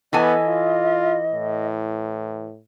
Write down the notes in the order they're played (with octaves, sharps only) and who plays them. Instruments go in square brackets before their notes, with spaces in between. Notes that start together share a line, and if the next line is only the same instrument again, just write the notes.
[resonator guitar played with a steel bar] E3 A4 G#5 [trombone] B3 [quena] D#5
[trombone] F4
A2